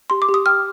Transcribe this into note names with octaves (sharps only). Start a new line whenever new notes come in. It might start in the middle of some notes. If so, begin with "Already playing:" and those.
G4 C6
D6
G4
D#6
G5 F6